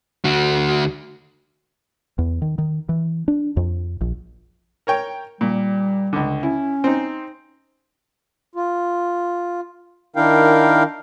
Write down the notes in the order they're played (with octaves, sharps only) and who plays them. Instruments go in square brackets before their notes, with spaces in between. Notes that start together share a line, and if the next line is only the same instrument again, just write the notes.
[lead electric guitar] D2 F#4
[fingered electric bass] E2
D#3
D#3
E3
D4
F2
A#1
[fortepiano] A#4 C#5 G5
[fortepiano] A#2 [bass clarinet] G3
[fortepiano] C#2 D3
[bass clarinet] C#4 [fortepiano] E4
[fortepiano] C4 D#4
[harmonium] F4
D#3 D4 E4 A#4 F5 G5